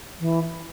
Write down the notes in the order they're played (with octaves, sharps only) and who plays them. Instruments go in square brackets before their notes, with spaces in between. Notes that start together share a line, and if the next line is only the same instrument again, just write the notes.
[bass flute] E3